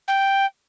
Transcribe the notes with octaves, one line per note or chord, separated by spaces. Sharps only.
G5